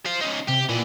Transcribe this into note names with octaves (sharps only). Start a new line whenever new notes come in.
C5 F5
C#4 D#4
C3 G4
A#2 E3 D5